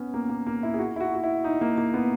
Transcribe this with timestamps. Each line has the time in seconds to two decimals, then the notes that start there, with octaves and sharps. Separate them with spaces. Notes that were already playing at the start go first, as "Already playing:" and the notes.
Already playing: B3 C#4
0.14 A#3
0.29 A#3
0.46 A#3
0.63 E4
0.74 G#4
0.79 F#4
0.96 E4
1.00 F#4
1.15 F#4
1.23 E4
1.44 D#4
1.61 A#3
1.78 A#3
1.94 B3